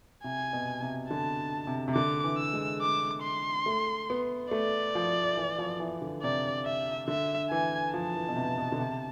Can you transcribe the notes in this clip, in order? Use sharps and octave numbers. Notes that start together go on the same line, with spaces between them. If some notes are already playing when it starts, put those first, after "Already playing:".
C3 G#5
B2
C3
D3 A5
C3
C3
D3 D6
E3
E6
G#3
D6
C6
A3
B3
A3 D5
F3
E3
F3
E3
D3
C3 D5
E5
D3 E5
E3 G#5
F3 A5
E3
B2
C3
C3
B2
D3
C3